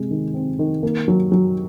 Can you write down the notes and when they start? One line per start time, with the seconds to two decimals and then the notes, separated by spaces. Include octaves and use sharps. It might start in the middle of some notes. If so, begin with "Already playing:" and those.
Already playing: C3 G#3
0.11 D#3
0.34 C4
0.59 D#3
0.83 A#3
1.08 F#3
1.32 F#3